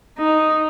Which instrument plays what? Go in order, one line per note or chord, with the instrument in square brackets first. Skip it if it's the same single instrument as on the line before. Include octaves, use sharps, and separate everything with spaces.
[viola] D#4